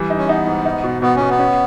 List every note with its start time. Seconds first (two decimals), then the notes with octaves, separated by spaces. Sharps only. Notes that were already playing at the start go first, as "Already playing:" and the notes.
Already playing: E3 G3
0.10 D#4
0.17 C#4
0.28 B3 D#4
0.47 G#2
0.65 D#4
0.83 B2
1.02 B2 B3
1.16 B2 C#4
1.29 B3
1.39 C#4